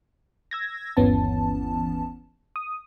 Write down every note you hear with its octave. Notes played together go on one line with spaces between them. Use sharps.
E6 G#6 A#6
G1 D#2 E3 B3 C#4 A5
D#6